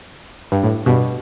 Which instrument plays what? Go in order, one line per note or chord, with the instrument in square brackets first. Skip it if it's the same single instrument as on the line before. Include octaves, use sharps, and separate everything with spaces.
[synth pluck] G2
A2
G2 B2